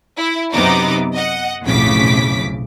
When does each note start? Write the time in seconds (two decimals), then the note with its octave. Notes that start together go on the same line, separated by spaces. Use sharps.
0.17 E4
0.53 F#2 C3 B3 C4 D#4 D6
1.14 D#5 F#5
1.65 B1 F2 A2 C#3 D6 B6